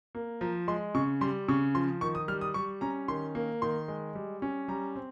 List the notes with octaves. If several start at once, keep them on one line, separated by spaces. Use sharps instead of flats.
A#3
F3 A#5
G#3 C6
C#3 C#6
G3 C6
C#3 C#6
F3 C6
D#3 C#6
D#6
G3 F6
D#6
G3 C#6
C#4 A#5
D#3 C6
A#3
D#3 C6
G#3
G3
C#4
G3 A#5
C4